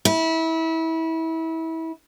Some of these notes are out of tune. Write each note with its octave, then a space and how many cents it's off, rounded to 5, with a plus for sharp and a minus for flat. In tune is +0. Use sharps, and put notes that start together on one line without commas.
E4 -25